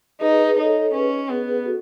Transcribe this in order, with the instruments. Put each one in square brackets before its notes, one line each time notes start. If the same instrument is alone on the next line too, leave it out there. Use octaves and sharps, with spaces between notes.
[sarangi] D#4 [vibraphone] G#4 B4
[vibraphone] G#4 B4
[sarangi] D#4 [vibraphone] A4 C#5
[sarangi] C#4 [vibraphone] G#4 B4
[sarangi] B3 [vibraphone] G#4 B4
[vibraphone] G#4 B4
F#4 A4